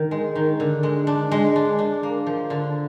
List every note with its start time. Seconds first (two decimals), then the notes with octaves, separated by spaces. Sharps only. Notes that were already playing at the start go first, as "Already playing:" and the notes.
Already playing: D#3
0.11 G#3
0.35 D#3
0.60 D3
0.83 G#3
1.07 D4
1.31 G#3
1.56 D4
1.79 D4
2.03 A#3
2.27 F3
2.50 D3